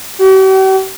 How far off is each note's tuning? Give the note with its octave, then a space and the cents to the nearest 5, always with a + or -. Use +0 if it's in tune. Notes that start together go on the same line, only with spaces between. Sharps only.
G4 -45